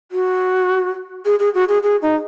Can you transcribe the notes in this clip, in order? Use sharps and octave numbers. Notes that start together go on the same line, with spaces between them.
F#4
G#4
G#4
F#4
G#4
G#4
D#4